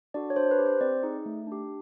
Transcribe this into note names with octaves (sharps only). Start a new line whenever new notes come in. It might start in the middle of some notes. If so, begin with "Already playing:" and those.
D4 F#4 A4 D5
C#5
D4 C5
B4
G4
C5
C4 D5
D#4 G#4
A3
D4 G4